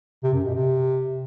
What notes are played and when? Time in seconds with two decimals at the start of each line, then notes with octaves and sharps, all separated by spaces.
0.23 C3
0.34 F#2
0.44 B2
0.54 C3